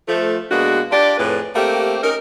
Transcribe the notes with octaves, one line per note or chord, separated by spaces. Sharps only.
F3 A3
B2 G#3 A#3 D4 F#4
D4 F4 G4 D5
F2 A2 G#4 B4
A3 A#3 C4 G4
C#4 D#4 A#4